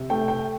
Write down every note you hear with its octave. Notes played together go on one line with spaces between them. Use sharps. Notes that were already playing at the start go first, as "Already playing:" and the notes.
Already playing: C3
A3 G5
G5